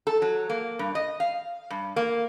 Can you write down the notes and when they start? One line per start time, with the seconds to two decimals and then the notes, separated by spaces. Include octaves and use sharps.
0.07 A4
0.22 F#3
0.50 A#3
0.79 G2
0.95 D#5
1.20 F5
1.70 G2
1.96 A#3